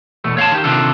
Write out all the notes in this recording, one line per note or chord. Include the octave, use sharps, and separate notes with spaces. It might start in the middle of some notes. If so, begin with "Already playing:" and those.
E2 B2 A3
C#5 F5 F#5 A5
D#3 G4
C3 D#3 D4 F4 A4